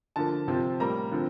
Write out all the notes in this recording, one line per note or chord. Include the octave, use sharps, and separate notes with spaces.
D3 F3 A#3 A5
C3 F3 C4
A2 G3 A#3 A#5
D3 F3 C4